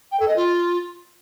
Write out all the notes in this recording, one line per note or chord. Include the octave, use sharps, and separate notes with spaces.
G5
A4
D#5
F4